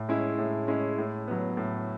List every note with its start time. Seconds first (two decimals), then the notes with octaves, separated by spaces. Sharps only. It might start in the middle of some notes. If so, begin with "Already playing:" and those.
Already playing: A2
0.09 G#3 C#4 E4
0.39 A2
0.68 G#3 C#4 E4
0.98 A2
1.28 F#3 B3
1.57 A2